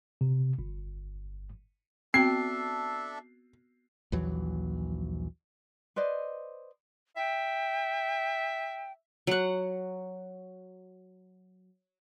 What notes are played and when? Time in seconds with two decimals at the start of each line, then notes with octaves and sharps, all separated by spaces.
0.21 C3
0.59 G1
2.14 B3 C4 D4 F#4 A4 E5 G5 C7
4.12 A#1 D#2 E3 F#3
5.96 B4 C5 D5 D#5
7.17 E5 G5
9.27 F#3 F#5